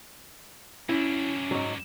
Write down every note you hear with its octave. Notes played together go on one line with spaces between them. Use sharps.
F#2 C#4 D4 E4
G#2 F#3